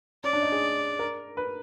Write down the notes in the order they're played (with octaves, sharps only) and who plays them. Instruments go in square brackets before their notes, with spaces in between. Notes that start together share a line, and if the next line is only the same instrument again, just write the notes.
[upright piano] C#4 [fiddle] D5
[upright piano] D4
D#4
G#4
A#4
B4